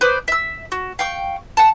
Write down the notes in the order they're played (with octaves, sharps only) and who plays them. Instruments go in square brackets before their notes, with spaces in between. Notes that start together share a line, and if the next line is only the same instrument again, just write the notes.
[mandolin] B4 C5 D5 D#6
E5 E6
F#4
F5 G5 C#6
F#5 A5